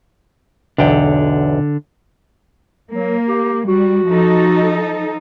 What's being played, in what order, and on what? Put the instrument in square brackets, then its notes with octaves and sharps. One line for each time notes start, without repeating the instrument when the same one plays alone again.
[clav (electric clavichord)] B1 E2 G5 [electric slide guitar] D3
[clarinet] F#3 [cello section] A#3
[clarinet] G4
[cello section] G3 [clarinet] F#4
[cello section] F3 D#4 A4